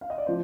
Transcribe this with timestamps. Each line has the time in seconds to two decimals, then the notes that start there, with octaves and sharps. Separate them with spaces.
0.01 F5
0.10 D#5
0.18 D5
0.27 F3 C5